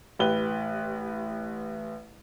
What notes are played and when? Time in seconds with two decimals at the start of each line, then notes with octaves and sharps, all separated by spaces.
0.19 A1 G4 B4 G7